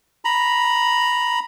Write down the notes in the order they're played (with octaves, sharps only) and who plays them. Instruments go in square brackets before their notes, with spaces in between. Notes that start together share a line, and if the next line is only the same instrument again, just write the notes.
[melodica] A#5 B5